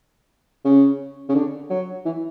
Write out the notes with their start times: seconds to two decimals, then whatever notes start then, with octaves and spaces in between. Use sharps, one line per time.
0.65 C#3
1.29 C#3
1.35 D3
1.70 F#3
2.05 E3